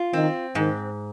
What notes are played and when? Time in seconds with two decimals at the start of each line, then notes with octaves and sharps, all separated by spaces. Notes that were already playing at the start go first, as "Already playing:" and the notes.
Already playing: F4
0.13 D#3 C4
0.55 G#2 D#3